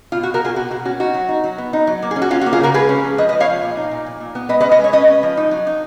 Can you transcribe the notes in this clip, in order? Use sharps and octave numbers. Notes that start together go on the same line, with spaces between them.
B2 F4
F#4
B2
F#4 A#4
B2 F4 G#4
B2 F#4
B2 F#4
C#4 F#4
D#4 F#4
F#3
D#4
F#3
B3
D#4
F#3
A#3
G#4
C#4
F#4
C#4 F4
F#4
A#3
F4 G#4
C#3 F#4 A#4
G#3 G#4 B4
C#4
F3
F3 B4 D#5
B4 D#5
F3
C#5 F5
F3
A#2
D#4
A#2
A#2
A#2
B3
G#3 B4 D#5
B4 D#5
C#4
B4 D#5
G#3
C#5
C#4 B4 D#5
C#4
F3
D#4
F#3
D#4